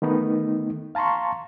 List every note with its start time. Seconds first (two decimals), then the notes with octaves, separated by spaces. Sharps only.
0.02 D#3 A3 B3 D#4
0.95 F5 A5 A#5 C6 C#6